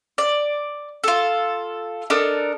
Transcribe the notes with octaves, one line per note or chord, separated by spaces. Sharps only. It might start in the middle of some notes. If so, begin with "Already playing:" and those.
D5
F4 A4
D4 A4 A#4 D#5